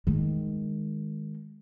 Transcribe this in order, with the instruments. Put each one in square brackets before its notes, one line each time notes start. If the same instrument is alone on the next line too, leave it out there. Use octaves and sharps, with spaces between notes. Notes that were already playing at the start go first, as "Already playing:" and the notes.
[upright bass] D#3 G#3